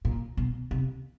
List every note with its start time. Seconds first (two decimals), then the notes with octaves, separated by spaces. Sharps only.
0.05 A#2
0.37 B2
0.71 C3